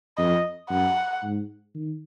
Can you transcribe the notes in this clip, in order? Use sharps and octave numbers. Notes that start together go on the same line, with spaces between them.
F2 D#5
F#2 F#5
G#2
D#3